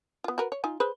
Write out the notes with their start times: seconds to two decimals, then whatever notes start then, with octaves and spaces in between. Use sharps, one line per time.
0.24 B3 F4
0.38 F#4 A#4 B4
0.52 C#5
0.64 D#4 F4 G#5
0.80 G#4 B4 C5